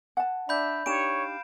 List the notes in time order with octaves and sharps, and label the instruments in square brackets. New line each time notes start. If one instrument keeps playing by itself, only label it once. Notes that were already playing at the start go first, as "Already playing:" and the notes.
[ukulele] F#5 A5
[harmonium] D4 D5 E5 [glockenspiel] B5 G6
[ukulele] D4 D#4 G4 [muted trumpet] C#5 [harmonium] F5 [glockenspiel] D7 E7